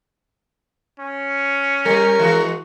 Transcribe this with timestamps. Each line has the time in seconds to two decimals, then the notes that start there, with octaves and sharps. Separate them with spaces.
1.00 C#4
1.85 G3 A#4
2.19 E3 G#3 F#4